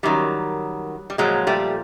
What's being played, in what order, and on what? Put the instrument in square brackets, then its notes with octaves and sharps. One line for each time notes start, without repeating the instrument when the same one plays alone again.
[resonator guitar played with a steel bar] F#2 D#3 F#3 G3
G3
A#2 F3 F#3 G#3
G3 A3